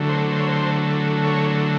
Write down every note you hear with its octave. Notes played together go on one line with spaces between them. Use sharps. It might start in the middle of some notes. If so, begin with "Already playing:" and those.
Already playing: D3 F#3 A3
C5
C5
C#5
C5
C#5